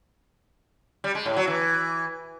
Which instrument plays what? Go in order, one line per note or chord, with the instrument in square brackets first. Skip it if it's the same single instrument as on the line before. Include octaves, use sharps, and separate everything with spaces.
[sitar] G3
G#3
A2
F#3
E3